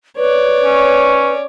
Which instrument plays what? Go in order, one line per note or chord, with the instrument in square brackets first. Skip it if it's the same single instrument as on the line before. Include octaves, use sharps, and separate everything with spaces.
[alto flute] B4 [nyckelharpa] C#5 D5
[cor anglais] C#4